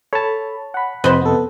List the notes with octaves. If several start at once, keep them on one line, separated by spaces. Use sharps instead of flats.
A4 C#5 A5 B5
F#5 B5
F2 C3 B4 C5 D#5
B3 A4